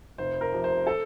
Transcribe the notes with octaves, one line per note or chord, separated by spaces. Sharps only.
F1 C5
A#4
F2 C3
C5
A4